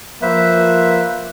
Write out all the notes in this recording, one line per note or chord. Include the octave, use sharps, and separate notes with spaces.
F3 A#3 B4 C5 E5